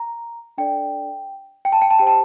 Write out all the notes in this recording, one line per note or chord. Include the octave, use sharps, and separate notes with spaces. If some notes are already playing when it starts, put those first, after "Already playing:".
Already playing: A#5
D4 A4 D5 G5
G5
A5
G5
A5
G4 C5 G5
A5